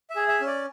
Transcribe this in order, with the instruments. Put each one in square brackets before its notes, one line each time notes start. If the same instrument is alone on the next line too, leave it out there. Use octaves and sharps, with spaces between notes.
[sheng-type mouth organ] E5
G#4
E5
C#4
D5